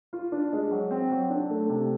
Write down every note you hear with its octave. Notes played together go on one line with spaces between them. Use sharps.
F4
D4
G#3
F#3
C4
F#3
D4
A3
C3